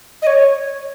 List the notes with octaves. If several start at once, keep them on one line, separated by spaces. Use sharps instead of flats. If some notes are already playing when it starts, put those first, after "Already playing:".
D#5
C#5